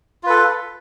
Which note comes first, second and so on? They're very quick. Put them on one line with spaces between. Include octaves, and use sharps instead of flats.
F4 B4 A4